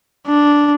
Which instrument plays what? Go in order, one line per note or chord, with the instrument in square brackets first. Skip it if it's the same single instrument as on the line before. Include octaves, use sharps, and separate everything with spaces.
[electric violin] D4